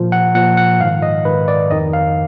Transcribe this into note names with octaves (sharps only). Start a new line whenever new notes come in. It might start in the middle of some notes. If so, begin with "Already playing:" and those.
Already playing: A#2 F3
F#5
A#2 F3 F#5
F#5
G#2 D#3 F5
D#5
G#2 D#3 B4
D5
F2 D#3 D#5
F5